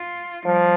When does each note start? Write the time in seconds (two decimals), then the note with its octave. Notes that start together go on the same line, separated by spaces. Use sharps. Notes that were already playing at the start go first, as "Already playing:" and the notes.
Already playing: F4
0.46 F3 G3